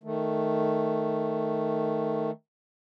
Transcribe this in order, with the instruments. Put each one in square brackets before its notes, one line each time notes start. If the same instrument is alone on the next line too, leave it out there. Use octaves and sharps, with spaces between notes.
[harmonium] D#3 A3